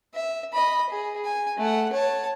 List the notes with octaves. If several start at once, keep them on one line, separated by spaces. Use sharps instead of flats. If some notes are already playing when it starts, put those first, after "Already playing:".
E5
D#5 B5
G#4
G#5
A3 F#5
C#5 A5